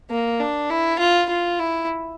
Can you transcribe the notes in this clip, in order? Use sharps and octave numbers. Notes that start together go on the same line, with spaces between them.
A#3
D4
E4
F4
F4
E4